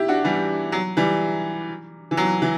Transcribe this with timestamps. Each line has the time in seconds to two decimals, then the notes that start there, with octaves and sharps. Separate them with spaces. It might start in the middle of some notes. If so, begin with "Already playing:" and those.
Already playing: E4 G4
0.08 D4 F#4
0.24 E3 G3
0.72 F#3
0.97 E3 G3
2.11 E3
2.17 F#3
2.42 E3